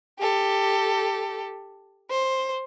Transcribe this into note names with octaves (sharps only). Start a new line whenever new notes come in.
G4 A4
C5